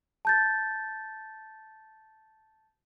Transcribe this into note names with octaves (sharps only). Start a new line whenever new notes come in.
A5 G6 A6